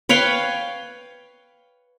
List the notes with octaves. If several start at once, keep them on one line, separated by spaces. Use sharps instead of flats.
B4 C#5 F5 G5